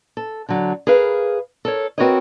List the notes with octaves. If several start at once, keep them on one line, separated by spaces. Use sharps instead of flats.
A4
D3 F#3
G#4 A#4 B4 F5
A4 A#4 C#5
C4 F#4 A#4 B4 C#5 D#5